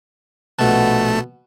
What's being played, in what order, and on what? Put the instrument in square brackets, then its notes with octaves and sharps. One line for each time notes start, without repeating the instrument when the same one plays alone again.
[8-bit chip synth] A#1 A3 A5 [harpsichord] B2